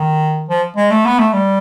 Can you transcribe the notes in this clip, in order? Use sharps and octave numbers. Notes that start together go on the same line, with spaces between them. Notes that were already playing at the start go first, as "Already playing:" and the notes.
Already playing: D#3
F3
G#3
A3
B3
A3
G3